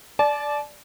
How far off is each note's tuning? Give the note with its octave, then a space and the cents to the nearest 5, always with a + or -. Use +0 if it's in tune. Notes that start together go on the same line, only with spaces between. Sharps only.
D5 +0 A5 -35